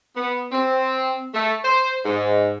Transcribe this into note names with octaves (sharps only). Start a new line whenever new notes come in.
B3
C4
A3
C5
G#2